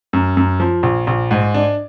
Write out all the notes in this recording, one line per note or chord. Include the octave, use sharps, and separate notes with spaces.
F#2
F#2
F3
A#1
A#1
G#2
D4